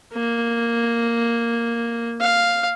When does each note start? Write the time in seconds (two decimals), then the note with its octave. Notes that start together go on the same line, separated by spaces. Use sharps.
0.14 A#3
2.21 F5